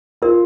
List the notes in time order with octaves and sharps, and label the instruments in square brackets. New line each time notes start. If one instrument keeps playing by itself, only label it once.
[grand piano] F4 [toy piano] A#4